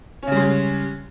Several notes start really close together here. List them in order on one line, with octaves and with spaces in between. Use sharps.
C#4 C#3 G3 G#3